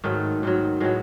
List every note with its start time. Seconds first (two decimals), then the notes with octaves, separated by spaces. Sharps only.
0.04 G#2 D#3 F#3 A3
0.43 G#2 D#3 F#3
0.80 A2 F#3 G#3 B3